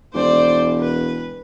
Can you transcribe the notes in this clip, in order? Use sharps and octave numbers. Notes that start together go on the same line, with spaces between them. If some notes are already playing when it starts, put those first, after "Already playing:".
E1 C5 D5
B4